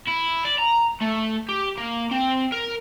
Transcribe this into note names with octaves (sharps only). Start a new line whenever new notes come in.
E4
D5
A#5
A3
G4
A#3
C4
A#4